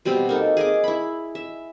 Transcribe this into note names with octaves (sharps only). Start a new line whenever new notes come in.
B2 G3 C4 B5
A#3 D#4 A4
G#4 D#5 D6
E4 B5
E5